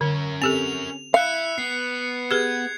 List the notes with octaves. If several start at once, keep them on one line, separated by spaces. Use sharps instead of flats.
D3 C#4 A#4
C4 G4 A4 F7
E4 E5 F5 F#6 C#7
B3 C7
G4 G#4 B4 G#6